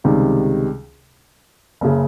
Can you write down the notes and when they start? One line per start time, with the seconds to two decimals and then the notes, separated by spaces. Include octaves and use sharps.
0.04 C#2 C3 D#3 G3
1.81 F#1 C#3